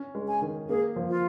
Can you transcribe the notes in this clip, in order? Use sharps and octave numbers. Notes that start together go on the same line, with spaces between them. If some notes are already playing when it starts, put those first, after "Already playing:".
Already playing: C#4
G#3
G#5
D#3
A#3 G#4
F3
F4